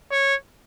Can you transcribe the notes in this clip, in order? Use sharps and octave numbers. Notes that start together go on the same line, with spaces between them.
C#5